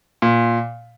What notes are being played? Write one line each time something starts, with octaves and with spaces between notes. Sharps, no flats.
A#2